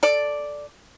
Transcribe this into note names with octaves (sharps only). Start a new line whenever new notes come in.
A4 D5